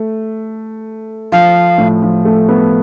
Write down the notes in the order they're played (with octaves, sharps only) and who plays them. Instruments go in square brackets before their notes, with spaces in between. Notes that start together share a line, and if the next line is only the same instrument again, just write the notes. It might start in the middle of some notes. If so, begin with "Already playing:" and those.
Already playing: [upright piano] A3
[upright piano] F3 [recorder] F5
[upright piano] A2
F3
A3
B3